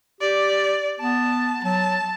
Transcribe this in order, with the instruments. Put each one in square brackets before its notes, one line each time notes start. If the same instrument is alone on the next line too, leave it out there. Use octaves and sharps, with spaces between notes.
[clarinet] G4 [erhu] D5
[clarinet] B3 [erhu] A5
[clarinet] F#3 [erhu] A5